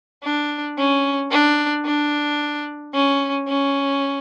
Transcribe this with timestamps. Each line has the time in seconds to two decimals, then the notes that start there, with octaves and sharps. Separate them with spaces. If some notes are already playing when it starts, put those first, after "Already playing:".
0.24 D4
0.78 C#4
1.31 D4
1.85 D4
2.94 C#4
3.48 C#4